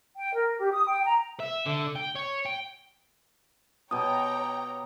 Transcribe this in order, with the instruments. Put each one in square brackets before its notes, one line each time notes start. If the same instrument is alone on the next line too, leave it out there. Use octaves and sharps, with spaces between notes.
[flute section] G5
A#4
G4
D#6
G5
A#5
[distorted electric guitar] E5
D3
G5
C#5
G5
[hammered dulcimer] B2 G4 [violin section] C#5 G5 A#5 [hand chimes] D#6